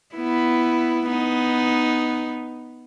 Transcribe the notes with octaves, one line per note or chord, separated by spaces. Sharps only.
B3 E4
B3 D#4